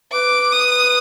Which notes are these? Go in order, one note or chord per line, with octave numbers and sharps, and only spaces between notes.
B4 D6
D#6